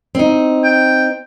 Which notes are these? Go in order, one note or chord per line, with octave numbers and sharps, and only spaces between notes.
C4 D#4
G5